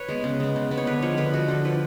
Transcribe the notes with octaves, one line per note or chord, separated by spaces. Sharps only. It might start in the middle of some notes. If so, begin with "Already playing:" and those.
Already playing: B4 C#5
G#3 B3
C#3
G#3 B3
C#3
G#3 B3
C#5
D3 B4
F3 G#3 C#5
D3 B4
F3 G#3 F#4
D3 A4
F3 G#3 B4